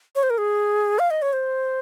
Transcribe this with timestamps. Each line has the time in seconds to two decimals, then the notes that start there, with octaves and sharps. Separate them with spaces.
0.15 C#5
0.23 C5
0.30 A#4
0.38 G#4
0.99 F5
1.10 D#5
1.22 C#5
1.33 C5